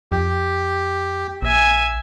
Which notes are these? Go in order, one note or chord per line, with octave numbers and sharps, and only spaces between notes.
F2 G4
A#1 E5 G#5